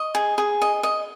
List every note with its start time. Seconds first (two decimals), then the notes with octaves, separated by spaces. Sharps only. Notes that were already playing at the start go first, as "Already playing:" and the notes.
Already playing: D#5 C#6
0.15 G#4
0.38 G#4
0.62 D#5
0.83 D#5